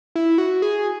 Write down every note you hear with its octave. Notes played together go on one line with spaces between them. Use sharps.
E4
F#4
G#4